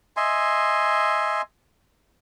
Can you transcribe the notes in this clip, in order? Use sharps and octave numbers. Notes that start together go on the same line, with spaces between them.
D#5 E5 G#5 C6